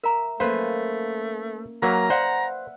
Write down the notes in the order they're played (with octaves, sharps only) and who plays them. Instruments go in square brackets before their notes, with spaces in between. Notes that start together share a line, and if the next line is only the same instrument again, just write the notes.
[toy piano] A#4 A#5 [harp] E5
[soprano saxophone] A3 [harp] A#3 C#4 [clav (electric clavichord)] B4 C5 [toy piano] F5
[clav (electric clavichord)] F#3 A#3 [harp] B4 E5 F6 [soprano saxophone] A#5 [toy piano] E6
[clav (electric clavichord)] C5 [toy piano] D5 F5 [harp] F#5